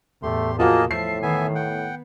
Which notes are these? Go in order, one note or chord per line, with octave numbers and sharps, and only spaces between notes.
E2 A2 A3 G4 C6
F3 A#3 F4 F#4 G#4 D#5 A5
A2 F3 E5 A5 C7
D#3 E3 B3 E5 G#5
B3 F#5 G5